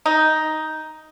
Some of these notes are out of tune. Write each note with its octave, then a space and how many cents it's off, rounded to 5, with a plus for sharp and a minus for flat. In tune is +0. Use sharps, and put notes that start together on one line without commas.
D#4 +5